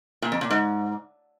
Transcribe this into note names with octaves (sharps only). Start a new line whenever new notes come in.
A#2
F2
A#2
G#2